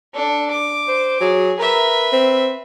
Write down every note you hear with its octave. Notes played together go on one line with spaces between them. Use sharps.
D4 A4
D6
C5
F#3 G#4
A#4 B4 E5
C4